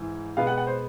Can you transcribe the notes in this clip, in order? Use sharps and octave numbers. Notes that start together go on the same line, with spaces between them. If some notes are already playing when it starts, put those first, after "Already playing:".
Already playing: G#2 E3
B2 G#3 B3 F5
F#5
F#5
C5